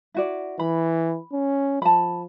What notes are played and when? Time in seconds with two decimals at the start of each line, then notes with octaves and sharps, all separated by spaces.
0.14 E4 F#4 D5
0.59 E3 B5
1.33 C#4
1.82 F3 A5 B5